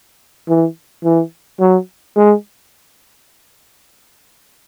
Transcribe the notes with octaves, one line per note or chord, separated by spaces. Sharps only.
E3
E3
F#3
G#3